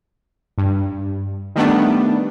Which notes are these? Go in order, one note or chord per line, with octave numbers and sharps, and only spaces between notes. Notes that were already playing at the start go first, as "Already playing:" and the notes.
G2
D#3 G3 A3 B3 D4